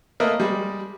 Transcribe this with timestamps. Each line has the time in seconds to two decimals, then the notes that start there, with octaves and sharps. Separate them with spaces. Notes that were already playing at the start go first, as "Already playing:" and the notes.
0.20 A3 A#3 A#4 B4 D#5 E5
0.40 G3 G#3